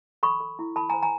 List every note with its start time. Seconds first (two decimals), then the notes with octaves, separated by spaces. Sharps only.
0.23 A4 B5 C#6
0.40 A4
0.59 E4
0.76 A4 A5 B5
0.89 G#5 A#5
0.94 C5
1.03 G#5 A#5